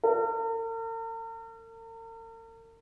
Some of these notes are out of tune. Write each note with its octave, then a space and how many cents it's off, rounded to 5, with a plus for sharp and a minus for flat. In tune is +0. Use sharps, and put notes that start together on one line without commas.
A#4 -45